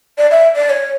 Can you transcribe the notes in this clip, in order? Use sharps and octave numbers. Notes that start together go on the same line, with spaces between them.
D5
E5
D5
C#5